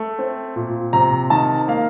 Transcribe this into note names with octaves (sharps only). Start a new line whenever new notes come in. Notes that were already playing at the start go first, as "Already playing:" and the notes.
Already playing: A3
C4
A#2
C3 A#5
D#3 A5
A#3 F5